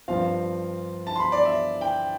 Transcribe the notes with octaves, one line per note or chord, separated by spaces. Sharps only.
G2 F3 C4 F4 F5
A5
C6
B5
D5
E5
G5